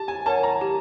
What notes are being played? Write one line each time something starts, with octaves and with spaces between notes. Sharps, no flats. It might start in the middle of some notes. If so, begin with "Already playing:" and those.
Already playing: G4 A5
G#5
A#4 C#5 F#5 A5
A#5
G4